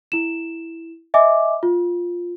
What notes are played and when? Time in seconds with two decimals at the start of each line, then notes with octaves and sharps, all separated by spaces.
0.12 E4 E7
1.14 D#5 E5 G#5 D6
1.63 F4